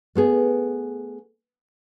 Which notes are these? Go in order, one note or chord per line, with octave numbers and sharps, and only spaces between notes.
A3 B3 G#4